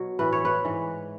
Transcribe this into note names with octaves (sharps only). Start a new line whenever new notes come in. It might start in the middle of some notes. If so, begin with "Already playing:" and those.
Already playing: B2 F#3
A2 E3 B4
C#5
B4
G#2 E3